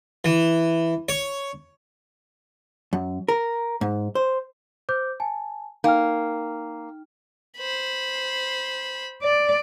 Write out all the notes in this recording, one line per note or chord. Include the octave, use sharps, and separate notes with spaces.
E3
C#5
F#2
A#4
G#2
C5
C5 D6 G6
G#5 A5
A#3 D#4 G5 F6
C5 B5
D5